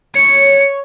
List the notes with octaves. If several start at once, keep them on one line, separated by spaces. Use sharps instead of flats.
C#5 C#7